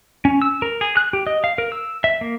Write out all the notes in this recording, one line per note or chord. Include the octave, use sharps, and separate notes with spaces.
C#4
E6
A#4
G#4
F#6
G4
D#5
F5
A#4
E6
E5
A#3